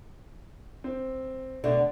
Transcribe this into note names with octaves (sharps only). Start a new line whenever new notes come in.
C4
B2 D3 A3 D4